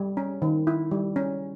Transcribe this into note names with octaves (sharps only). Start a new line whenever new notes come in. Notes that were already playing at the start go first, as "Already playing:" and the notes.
Already playing: G3
C#4
D#3
E4
G3
C#4